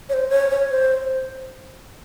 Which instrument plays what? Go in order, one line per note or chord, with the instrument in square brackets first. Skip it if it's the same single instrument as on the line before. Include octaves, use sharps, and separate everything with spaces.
[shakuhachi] C#5
C5
C#5
C#5
C5